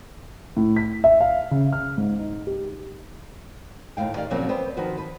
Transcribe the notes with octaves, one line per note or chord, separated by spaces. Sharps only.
A2
B6
E5
F5
C#3
F6
G#2
D#4
G4
D#2 A2 F5 G5
D#3 G4 D5 F5
A#2 C#3 F3 F#3 A#3 C4
B3 C5 D5 G5
D#3 F3 F#4 B4 C5
B4